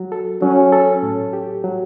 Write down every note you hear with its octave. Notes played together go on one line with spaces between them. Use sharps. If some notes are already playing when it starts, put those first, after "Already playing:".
Already playing: F#3 F#4
A4
F#3 C#4
A4
A2
G4
F#3